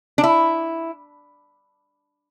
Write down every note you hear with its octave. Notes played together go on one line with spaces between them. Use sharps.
D4
E4